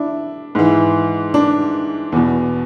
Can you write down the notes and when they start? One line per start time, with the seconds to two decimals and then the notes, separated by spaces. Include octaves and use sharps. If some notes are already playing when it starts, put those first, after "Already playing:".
Already playing: D4 E4
0.55 G#2 E3
1.34 D4
2.12 E2 B2